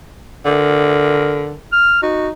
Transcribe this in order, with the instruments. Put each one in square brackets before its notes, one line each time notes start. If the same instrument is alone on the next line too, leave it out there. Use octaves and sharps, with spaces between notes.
[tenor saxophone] D3 [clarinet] A#4
[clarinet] F6
[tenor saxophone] D#4 [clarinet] F#4